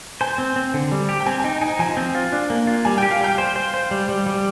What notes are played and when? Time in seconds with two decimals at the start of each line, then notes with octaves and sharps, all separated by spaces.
0.21 C5 G#5
0.38 C4
0.56 C4
0.74 D3
0.92 G3
1.09 G4
1.20 G5
1.26 C4 G#5
1.40 G#5
1.44 D#4 G5
1.61 D#4 G#5
1.79 F3 G#5
1.97 C4
2.15 F4
2.32 D4
2.50 A#3
2.67 F4
2.85 G3 G#5
2.98 G4 G5
3.11 F5
3.21 G3 G5
3.38 C5
3.56 C5
3.74 C5
3.91 G3
4.09 G3
4.26 G3